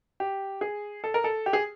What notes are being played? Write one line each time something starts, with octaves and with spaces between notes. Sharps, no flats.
G4
G#4
A4
A#4
A4
G4
G#4